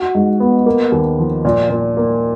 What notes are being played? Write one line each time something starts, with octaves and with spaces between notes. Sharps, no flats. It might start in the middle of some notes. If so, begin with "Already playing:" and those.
Already playing: F#4
G#2
B3
A#3
D#2
F3
A#2
A#2
A#3